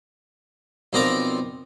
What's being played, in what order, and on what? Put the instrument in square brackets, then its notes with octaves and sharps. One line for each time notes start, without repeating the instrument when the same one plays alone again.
[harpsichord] B1 F3 C4 A#4 D5 A#5